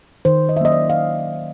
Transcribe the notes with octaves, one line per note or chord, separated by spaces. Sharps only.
D#3 C5
D#5
E5
F#3 A#3 C#4 D#5
D5
F5